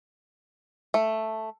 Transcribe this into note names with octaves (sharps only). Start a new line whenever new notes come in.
A3